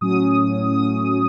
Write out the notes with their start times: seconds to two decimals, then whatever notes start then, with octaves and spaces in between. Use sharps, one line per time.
0.01 A2 F#3 C#4 D#6
0.69 D#6